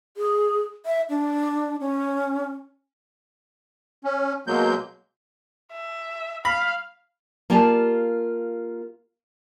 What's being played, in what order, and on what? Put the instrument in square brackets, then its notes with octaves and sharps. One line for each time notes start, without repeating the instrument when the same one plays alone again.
[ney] G#4
E5
D4
C#4
[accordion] C#4
B2 F#3 G#3 A#3 G6
[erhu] E5
[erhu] F5 [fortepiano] B5
[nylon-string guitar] A#3 F4 G4 D5 G#5 A5